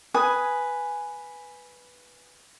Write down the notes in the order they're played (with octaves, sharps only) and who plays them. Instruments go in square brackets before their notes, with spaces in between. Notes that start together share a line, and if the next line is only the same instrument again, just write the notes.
[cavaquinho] B4 G#5 D#6